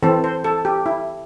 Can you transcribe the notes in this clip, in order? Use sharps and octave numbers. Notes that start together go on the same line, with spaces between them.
E3 C4 A4
C5
A4
G4
E4